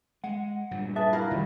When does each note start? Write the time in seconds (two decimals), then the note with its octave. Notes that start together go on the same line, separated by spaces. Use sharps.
0.24 G#3 F#5
0.71 G2 A#2 F#3
0.96 G#4 B4 E5 A5
1.13 E4 F#4 A#4 F5
1.31 A1 F2 A#2 D#3 G3